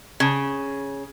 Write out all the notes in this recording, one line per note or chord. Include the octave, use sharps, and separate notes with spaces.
C#3